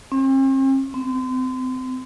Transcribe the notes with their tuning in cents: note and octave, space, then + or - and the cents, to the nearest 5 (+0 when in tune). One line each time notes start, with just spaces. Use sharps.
C4 +45
C4 -30